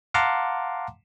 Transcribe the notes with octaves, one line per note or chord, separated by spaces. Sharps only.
F5 F#5 A5 A#5 C6 D6